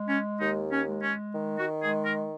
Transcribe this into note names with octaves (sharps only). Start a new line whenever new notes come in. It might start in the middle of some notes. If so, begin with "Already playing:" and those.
Already playing: G#3
C#4
D#2 D#4
C#4
G#3
C#4
D#3
F#4
G#3 G#4
A#4